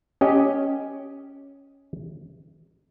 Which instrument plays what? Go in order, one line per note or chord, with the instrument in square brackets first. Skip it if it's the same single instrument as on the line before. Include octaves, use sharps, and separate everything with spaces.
[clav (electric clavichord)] C#4 G4 D#5